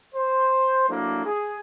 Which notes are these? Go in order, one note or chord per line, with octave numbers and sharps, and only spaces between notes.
C5
F#3 A3 A#3 D4 E4
G#4